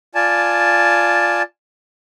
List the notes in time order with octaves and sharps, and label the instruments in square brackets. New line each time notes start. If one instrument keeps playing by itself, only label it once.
[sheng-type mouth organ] F4 D5 G#5 A5